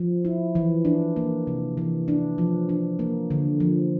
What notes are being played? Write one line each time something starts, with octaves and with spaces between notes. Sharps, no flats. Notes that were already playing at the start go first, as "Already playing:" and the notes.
Already playing: F3
E4
E3
D4
A#3
C3
E3
D4
F3
D4
A#3
D3
F3